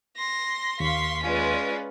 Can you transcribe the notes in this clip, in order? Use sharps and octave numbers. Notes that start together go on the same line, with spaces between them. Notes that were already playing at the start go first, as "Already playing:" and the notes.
C6 A#6
D#2 F5 C6 C#6 B6
G#3 C#4 F4 B4 D5